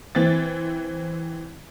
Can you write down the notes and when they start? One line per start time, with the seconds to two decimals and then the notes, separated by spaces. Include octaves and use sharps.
0.15 E3 C4 A6